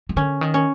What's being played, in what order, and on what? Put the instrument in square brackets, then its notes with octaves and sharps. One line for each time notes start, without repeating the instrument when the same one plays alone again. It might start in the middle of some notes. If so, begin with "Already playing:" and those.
[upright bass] D#3
[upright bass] D3 [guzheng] C#4
[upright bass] D#3
[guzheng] C#4